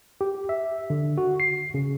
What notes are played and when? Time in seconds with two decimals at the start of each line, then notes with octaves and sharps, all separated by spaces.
0.21 G4
0.49 E5
0.90 D3
1.18 F#4
1.40 C7
1.74 C#3